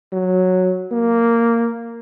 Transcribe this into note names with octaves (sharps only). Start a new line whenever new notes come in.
F#3
A#3